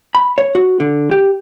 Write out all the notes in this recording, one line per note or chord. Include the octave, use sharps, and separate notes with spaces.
B5
C#5
F#4
D3
G4